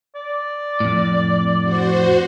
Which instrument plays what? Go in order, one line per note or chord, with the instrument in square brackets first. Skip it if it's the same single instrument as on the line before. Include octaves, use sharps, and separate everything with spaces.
[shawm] D5
[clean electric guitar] F2 A2
[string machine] F#4 C5